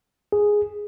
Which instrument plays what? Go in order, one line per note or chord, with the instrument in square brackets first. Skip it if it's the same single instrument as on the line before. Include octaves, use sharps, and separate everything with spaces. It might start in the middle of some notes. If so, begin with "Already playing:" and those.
[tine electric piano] G#4